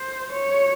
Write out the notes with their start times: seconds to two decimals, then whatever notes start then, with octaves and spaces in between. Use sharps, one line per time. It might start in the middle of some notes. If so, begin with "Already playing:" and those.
Already playing: C5
0.33 C#5